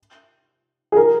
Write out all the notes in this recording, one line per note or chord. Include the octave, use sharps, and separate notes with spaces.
G#4
A#4